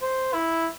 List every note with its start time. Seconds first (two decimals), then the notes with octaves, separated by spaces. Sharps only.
0.02 C5
0.34 E4